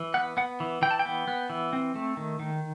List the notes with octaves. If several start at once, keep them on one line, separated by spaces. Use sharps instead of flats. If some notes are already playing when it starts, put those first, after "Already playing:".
Already playing: E3
B3 F#5
B3 F#5
E3
E3 G5
A5
G5
B3
B3
E3
C4
A3
D#3
D#3